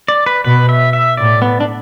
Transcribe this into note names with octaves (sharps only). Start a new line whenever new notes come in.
D5
B4
B2 B4
E5
E5
A2 D5
B3
D4